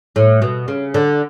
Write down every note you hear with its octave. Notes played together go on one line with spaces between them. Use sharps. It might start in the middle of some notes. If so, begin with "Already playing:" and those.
A2
B2
C#3
D3